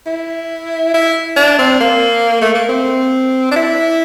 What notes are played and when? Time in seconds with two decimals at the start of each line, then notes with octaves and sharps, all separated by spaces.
0.06 E4
0.94 E4
1.36 D4
1.59 C4
1.80 A#3
2.42 A3
2.55 A#3
2.69 C4
3.51 D4
3.56 E4